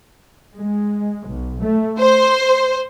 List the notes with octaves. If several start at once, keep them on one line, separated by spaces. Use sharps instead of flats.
G#3
B1
A3
C5